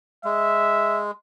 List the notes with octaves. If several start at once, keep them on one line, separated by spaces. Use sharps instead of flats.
G#3 E5